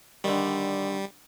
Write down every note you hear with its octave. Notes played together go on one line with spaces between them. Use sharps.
D3 D#3 G3